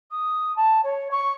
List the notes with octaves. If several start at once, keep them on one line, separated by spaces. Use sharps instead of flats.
D#6
A5
C#5
C#6